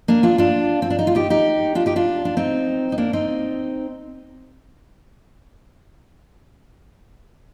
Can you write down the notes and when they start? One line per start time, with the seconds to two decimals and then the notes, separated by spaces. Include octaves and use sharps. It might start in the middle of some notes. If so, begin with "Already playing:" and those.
0.08 A#3 D4
0.23 D4 F4
0.38 D4 F4
0.82 C4
0.90 D4
0.99 D#4
1.07 F4
1.15 D#4 G4
1.30 D#4 G4
1.75 D4 F4
1.86 D#4 G4
1.96 D4 F4
2.25 D4
2.37 C4 D#4
2.92 D#4
2.98 A#3 D4
3.13 C4 D#4